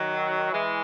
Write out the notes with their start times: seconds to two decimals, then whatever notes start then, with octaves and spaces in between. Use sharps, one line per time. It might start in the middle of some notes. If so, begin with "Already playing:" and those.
Already playing: D#3 F#3
0.52 E3 G#3